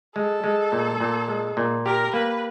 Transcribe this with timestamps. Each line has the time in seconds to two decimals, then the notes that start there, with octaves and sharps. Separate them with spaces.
0.16 G#3 A4
0.44 G#3
0.72 A#2
1.00 A#2
1.28 G#3
1.57 A#2
1.86 G4 A#4
2.13 A#3 B4